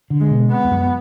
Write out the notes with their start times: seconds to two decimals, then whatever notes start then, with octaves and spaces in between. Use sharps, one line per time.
0.10 D3
0.20 G#3
0.31 B2
0.50 B3
0.64 E2
0.71 F#2